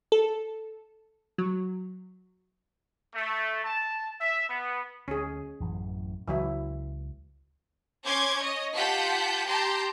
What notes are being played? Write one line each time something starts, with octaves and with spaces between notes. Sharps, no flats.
A4
F#3
A3
A5
E5
B3
D2 C#4 G#4
A1 F#2 E3
C#2 E3 F#3 E4
C#4 C6 D6 G6 G#6
C#5 D#5
F4 G4 F#5 A5 G6 B6
G4 G5 A5 A#5 C6 G6